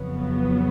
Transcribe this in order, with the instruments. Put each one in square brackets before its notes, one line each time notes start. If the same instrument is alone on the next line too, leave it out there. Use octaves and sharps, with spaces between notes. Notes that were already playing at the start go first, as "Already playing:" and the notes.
Already playing: [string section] F2 C#3 F#3 B3